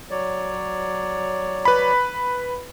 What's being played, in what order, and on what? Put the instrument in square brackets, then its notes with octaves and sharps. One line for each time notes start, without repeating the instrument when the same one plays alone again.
[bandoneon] F#3 C#5 D5
[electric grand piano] B4 B5